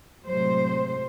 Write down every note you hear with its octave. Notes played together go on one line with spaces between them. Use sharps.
A2 C3 F#3 G#3 C5